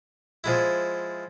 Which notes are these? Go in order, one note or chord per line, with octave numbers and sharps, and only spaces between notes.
F3 G#3 E4